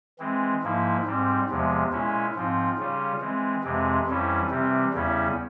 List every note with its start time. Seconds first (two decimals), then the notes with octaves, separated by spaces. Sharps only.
0.19 E3 G#3 C4
0.63 G#2 F3 A#3 E4
1.05 G#2 G3 C4
1.49 E2 C3 F3 G#3
1.92 A#2 G#3 C#4 E4
2.35 G#2 F3 C4 F4
2.78 C#3 G3 C#4 F4
3.21 E3 G#3 C4
3.63 F2 C3 E3 G#3 C4
4.07 F2 E3 G3 C#4 E4
4.50 C3 E3 G3 C4
4.94 E2 C#3 G3 C#4 E4